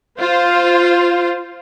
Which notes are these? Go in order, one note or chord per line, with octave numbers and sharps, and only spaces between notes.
F4 C5